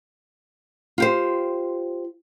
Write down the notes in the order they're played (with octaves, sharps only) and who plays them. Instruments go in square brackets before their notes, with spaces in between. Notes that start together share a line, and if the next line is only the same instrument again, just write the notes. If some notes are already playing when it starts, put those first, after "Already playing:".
[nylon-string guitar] F4 G4 C5